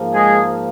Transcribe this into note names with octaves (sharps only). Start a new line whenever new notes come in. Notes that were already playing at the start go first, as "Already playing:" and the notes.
Already playing: G#2 F3 A#3
G#3 G#4